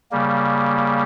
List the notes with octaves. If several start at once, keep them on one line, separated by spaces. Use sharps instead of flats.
C#3 G3 A#3